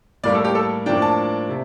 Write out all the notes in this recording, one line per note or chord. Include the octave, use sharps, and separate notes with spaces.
A2 G3 A#3 D5
A4
G4
A4
A2 F3 A#3 D4 G5
A5
C3